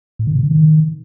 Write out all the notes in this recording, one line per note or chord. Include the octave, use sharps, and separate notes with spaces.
A2
D3
C3
D3
D#3